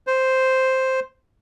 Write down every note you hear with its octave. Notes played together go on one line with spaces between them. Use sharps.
C5